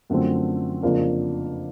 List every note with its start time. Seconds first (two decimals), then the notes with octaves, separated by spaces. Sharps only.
0.10 F#2 D3 F3 A3 C4
0.83 F2 C#3 F3 A#3 D4